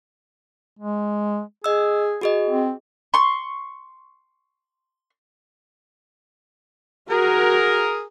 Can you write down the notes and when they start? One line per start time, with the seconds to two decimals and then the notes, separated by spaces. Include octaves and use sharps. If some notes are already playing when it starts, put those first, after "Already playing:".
0.79 G#3
1.64 G#4 D#5 E6
2.21 F#4 G#4 D#5
2.50 C4
3.14 C6 C#6
7.10 F#4 G#4 A#4